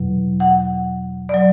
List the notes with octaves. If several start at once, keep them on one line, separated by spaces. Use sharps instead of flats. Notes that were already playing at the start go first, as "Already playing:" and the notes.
Already playing: E2 B2 F#3
F#5
F#3 D5